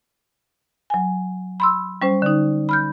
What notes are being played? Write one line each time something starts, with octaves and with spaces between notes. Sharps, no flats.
F#3 G#5
B5 C6 E6
G3 C#4 C5
D3 D#4
B5 F6 G6